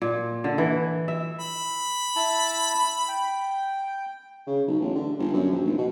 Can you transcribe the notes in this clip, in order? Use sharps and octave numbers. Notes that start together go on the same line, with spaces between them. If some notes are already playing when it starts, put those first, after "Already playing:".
A#2
D3
E3
E5
B5
E4 A5
G5
C#3
B1
A1
D3
G1
F#2
A#1
F1
B2